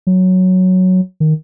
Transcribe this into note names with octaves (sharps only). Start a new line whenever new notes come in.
F#3
D#3